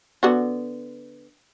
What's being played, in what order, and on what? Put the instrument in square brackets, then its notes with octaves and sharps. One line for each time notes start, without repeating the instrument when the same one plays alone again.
[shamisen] D3 B3 F#4